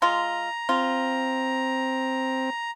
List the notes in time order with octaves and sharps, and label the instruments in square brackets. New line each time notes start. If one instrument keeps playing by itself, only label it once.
[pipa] G#3 F4 [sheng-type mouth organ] A#5
[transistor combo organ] C4 [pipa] F4